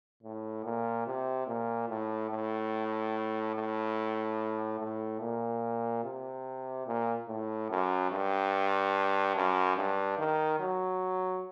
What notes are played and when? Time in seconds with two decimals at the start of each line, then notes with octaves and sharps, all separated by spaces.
0.23 A2
0.65 A#2
1.07 C3
1.47 A#2
1.89 A2
2.31 A2
3.55 A2
4.80 A2
5.21 A#2
6.04 C3
6.87 A#2
7.28 A2
7.70 F#2
8.11 G2
9.36 F#2
9.77 G2
10.19 D#3
10.60 F#3